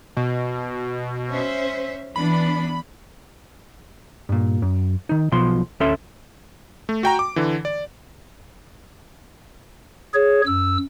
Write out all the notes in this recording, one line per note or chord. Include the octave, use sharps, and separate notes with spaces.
B2
C#4 C5 E5
E3 B3 D4 B5
G2 A#2
F#2
D#3 D#4
B1 B2 F3 C6
D2 C#4 A4 E5 C6
A3
F#4 G5 A#5
D6
D3 E3
D5
G#4 C#5
F#2 E6